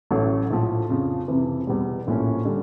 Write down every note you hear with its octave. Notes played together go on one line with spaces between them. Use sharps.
A1 A2 F#3 A3
A#1 A2 F3
F2 C#3 F3
F2 C3 E3
E2 B2 G3
A#1 A2 F3 A#3 C#4
D3 G3